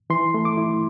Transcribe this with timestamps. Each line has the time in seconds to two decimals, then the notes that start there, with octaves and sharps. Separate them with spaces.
0.10 E3 C6
0.34 A3
0.45 D6
0.57 E4